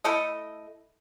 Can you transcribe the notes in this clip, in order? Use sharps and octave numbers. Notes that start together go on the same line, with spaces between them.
A3 E4 A4 D#5